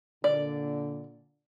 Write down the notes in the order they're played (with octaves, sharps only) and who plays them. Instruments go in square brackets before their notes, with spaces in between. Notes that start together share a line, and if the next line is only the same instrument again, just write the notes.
[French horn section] A#2 D3 [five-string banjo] D5